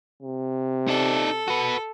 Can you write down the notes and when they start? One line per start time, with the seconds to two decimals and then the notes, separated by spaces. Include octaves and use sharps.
0.23 C3
0.88 D#4 A4 D5
1.48 F#4 B4